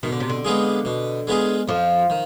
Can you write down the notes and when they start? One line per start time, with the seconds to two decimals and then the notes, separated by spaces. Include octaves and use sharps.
0.03 B2 D#3
0.12 D3
0.20 C3
0.30 D3
0.45 G#3 B3 F4 G#4
0.85 B2
1.27 G#3 B3 F4 G#4
1.68 F2 F3
2.10 D#3